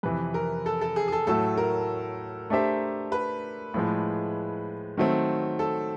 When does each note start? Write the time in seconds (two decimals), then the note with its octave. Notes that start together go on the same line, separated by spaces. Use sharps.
0.03 F2 C3 E3 B4
0.34 A#4
0.66 A4
0.81 A4
0.96 G#4
1.08 G#4
1.12 A4
1.27 A2 F#3 A3 A4
1.57 A#4
2.50 A3 D4 G4 C5 E5
3.12 B4
3.74 A2 F3 G#3
4.97 D#3 F#3 A3 C4
5.59 A4